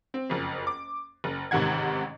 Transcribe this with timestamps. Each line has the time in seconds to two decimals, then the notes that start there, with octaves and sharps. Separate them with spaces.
0.14 C4
0.30 F#1 F2
0.67 D6
1.24 F#1
1.51 A1 G#2 C3 D#3 F#5 G#6